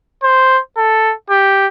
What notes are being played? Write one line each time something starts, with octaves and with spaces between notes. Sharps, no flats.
C5
A4
G4